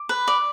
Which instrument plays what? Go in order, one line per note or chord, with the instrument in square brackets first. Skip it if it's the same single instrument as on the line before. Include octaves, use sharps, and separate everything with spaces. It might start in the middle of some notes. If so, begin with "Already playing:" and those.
Already playing: [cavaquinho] D6
B4
D5